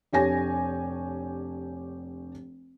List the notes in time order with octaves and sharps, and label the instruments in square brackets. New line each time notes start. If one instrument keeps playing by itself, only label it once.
[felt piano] F1 D4 G4 C#5 G#5 A#6